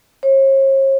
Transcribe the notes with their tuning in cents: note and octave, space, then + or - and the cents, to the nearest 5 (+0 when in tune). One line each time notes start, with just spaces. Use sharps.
C#5 -45